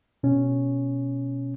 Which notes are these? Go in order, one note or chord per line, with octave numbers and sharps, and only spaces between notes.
B2 C#4